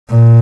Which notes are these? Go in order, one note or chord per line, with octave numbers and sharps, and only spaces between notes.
A#2